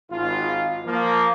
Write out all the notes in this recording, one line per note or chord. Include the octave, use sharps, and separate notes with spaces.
G#1 F4
F3 A#3